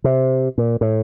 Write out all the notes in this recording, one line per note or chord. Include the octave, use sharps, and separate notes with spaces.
C3
A#2
A2